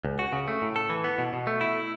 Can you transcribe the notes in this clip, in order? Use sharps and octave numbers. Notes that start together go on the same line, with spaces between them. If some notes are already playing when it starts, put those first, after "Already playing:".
C#2
F#4
C#3
A3
A2
A4
E3
B3
B2
B2
A3
E4